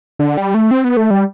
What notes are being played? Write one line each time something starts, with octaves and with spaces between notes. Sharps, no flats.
D3
G3
A3
C4
B3
A3
G3